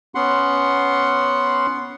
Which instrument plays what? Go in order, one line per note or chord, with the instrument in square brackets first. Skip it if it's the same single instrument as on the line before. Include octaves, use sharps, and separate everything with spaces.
[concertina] B3 C#4 F#5 C6